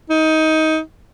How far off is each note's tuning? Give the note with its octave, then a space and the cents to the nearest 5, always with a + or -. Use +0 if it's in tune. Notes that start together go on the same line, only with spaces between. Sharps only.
D#4 +20